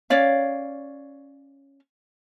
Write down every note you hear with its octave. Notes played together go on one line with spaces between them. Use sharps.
C#4 C#5 D5 F5